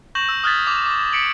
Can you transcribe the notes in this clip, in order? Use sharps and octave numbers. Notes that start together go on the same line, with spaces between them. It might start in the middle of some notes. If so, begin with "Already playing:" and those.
C#6 G6 A#6 E7 F#7
E6
D#6 F6 F#6 G#6 A6 B6
D6 F7
D6
B6 C#7 D7 F#7